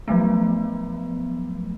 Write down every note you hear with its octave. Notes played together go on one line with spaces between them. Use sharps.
F3 F#3 A3 B3